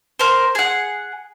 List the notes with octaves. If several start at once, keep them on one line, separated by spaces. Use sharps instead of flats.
A#4 C5
G#4 F#5